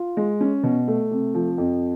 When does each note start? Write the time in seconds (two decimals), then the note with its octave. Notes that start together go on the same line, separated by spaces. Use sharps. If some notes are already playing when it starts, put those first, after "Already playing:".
Already playing: F4
0.17 G#3
0.41 C#4
0.63 B2
0.88 A3
1.11 C3
1.34 F3
1.58 F2